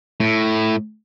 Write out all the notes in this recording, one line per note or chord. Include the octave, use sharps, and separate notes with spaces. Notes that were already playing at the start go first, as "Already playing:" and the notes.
A2